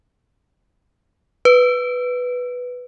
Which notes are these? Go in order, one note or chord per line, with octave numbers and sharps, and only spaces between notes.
B4